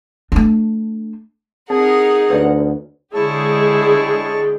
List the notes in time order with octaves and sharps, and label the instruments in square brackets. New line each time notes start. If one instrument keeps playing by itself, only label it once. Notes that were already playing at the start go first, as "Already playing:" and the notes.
[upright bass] A3 D4
[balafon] C4 [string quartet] D#4 A#4 F#5 [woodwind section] G#4
[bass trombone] D2 [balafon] B4 C#5
[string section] D3 G#3 G4 [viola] E4 [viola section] G#4 [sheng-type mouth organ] C#5 A5